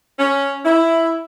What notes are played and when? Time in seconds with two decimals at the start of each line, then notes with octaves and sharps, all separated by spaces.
0.19 C#4
0.65 E4